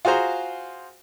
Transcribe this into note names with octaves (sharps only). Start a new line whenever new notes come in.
F4 F#4 G#4 C5 A#5